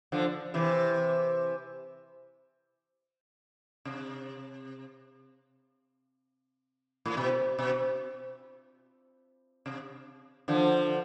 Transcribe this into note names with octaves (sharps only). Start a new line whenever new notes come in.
D3 F3
C3 E3
C3
A2
B2
B2
C3
D3 F3